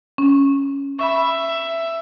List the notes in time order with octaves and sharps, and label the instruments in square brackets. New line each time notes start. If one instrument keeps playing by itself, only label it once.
[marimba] C#4
[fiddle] E5 [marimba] B5 C#6